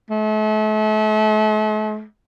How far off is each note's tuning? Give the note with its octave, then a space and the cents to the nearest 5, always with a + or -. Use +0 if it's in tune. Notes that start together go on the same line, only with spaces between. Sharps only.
A3 -40